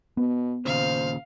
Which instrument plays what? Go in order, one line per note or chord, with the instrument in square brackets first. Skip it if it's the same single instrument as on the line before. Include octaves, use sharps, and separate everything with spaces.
[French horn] B2 [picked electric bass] B3
[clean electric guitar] D#2 A#2 C#3 [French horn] C5 [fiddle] F5